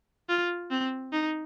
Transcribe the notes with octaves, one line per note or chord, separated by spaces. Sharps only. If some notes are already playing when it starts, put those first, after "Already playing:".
F4
C4
D#4